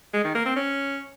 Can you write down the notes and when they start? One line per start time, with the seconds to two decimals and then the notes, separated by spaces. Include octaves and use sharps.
0.13 G#3
0.24 D#3
0.35 A#3
0.45 C4
0.56 C#4